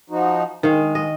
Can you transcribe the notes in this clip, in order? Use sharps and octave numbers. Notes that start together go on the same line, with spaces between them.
F3 D#4 F#4
D#3 G#3 F5
D#5